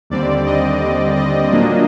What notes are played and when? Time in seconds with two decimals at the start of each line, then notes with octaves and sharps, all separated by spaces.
0.10 D#2 D3 G3 C4 D5
0.46 D#5
1.16 D#5
1.52 A#2 F#3 A#3 D4